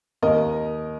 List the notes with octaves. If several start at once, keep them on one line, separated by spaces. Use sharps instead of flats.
D#2 A#4 D#5